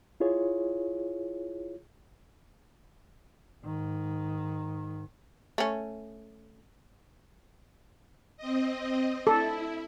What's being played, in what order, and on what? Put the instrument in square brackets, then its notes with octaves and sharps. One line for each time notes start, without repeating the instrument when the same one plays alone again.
[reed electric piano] E4 F4 G#4 C#5
[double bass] G#2 D#3
[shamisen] A3 C#4
[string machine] C4 D#5
[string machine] E4 [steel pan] A4